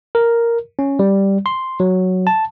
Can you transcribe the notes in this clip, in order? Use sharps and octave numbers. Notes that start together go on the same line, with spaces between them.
A#4
C#4
G3
C6
F#3
A5